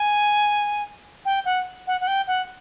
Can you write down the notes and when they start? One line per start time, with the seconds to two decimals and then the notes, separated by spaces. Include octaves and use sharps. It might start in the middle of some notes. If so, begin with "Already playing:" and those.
Already playing: G#5
1.25 G5
1.45 F#5
1.87 F#5
2.01 F#5
2.07 G5
2.27 F#5